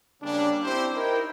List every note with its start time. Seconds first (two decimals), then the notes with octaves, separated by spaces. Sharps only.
0.22 C#3 G3 A#3 C#4 D4
0.64 C4 D4 E4 G4 C5
0.94 D#4 E4 A#4 G5